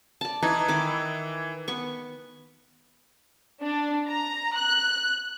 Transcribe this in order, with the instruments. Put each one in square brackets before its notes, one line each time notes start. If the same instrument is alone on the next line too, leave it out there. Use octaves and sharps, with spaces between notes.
[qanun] D5 A5
[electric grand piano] E3 G#6 [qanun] D#4
[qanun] D#3 E4 D6
B3 C#6
[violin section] D4
A#5
F#6